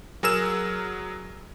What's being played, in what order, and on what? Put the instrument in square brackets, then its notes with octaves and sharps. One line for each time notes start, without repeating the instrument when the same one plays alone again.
[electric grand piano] F#3 G#4 A#4 E6 A#6 E7